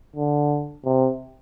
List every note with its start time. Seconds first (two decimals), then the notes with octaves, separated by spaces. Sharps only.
0.16 D3
0.85 C3